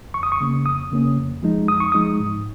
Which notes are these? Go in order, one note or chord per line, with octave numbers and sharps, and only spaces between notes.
F2 C#6
D#6
C#6
C#3 A#3 C#4
F2 D#6
C#3 A#3 C#4
F2
F3 G#3 D#4
F2 D#6
C#6
F3 G#3 D#4 D#6
G#2